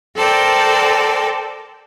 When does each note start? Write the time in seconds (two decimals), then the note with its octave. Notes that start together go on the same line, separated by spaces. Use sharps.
0.15 A4 A#4 C5 D5 G5 A5